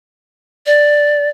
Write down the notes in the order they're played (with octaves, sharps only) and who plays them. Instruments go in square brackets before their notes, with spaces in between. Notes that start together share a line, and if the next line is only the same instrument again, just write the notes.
[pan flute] D5